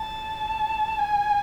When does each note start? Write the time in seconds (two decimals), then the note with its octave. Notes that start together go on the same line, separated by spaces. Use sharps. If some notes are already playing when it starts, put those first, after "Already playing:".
Already playing: A5
0.98 G#5